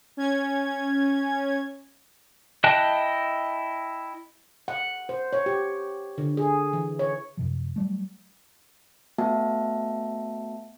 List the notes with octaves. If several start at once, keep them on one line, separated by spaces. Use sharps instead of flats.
C#4 G#6
E4 D#5 G5 A5 F#6
F#5
C5
C#5
G4
D3
G#4
E3
C#5
F#2 C3 F3
F#3 G3 A3
A3 B3 F#4 E5 A5